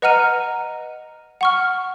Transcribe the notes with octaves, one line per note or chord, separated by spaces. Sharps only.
B4 D#5 F#5 A#5 F6 D#7
F#5 C#6 F6